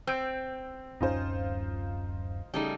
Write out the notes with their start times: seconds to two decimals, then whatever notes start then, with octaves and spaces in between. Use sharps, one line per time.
0.07 C4 E6 G6 D7
1.01 D1 F#2 C#4 D#4 F4 C5
2.54 C#3 G3 A3 D#4